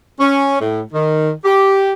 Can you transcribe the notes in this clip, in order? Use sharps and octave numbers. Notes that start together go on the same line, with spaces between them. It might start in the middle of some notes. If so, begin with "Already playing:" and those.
C#4
A2
D#3
G4